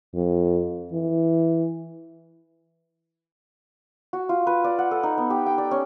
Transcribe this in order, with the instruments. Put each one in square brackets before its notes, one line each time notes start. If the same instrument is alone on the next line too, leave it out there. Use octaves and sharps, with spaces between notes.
[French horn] F2
E3
[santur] F#4
F4
B4
D5
F#5
A4
D#4
B3
G4
G5
D5
C#4